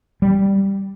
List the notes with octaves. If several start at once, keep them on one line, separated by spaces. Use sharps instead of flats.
G3